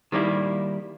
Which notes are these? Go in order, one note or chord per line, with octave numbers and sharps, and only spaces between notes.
D#3 G3 A#3 E4